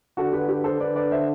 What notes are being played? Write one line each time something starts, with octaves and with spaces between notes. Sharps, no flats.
D3 F#4 A4
G4 B4
G4 B4
A4 C5
D3 B4 D5
B4 D5
C5 E5